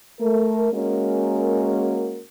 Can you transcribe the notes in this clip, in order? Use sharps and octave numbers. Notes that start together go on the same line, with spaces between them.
A3 A#4
G#3 A#3 C#4 F#4 A#4